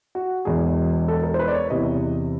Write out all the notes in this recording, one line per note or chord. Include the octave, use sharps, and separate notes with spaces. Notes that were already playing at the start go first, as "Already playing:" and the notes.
F#4
E1 E2 B2 G#4
A4
A#4
C5
B4
D5
C#5
E2 C3 E3 D#5